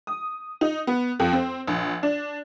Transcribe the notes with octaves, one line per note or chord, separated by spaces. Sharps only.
D#6
D#4
B3
F2
C4
A#1
D4